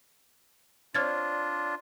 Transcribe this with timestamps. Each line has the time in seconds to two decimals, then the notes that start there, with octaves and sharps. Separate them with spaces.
0.95 C4 D4 F4 C#5 D5 F6 G#6 A6